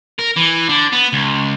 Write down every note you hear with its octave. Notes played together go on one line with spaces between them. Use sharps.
A#4
E3
D3
B3
C#2